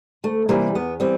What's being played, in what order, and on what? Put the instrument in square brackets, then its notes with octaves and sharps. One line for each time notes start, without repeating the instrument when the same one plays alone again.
[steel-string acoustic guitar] D2 A3
C3 E3 G3 A#3
E2 B3
E3 G3 C4